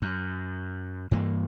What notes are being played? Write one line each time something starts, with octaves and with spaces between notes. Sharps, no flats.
F#2
G2 E3 A#3